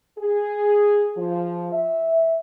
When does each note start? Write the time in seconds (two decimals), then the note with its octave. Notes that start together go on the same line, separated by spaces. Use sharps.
0.19 G#4
1.17 F3
1.73 E5